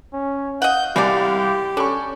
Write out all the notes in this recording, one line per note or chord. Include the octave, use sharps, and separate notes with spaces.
C#4
D#5 F5 F#5 G6
C2 G#3 A#3 G4 D5
C#4 D4 A4 C#6